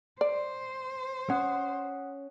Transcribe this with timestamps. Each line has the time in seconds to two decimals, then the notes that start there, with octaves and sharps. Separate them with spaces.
0.21 C5 D5
1.30 C#4 F#5 D#6 F#6